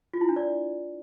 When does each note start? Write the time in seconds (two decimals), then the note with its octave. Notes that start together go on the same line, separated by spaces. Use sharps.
0.13 F4
0.21 E4
0.29 D4
0.36 D5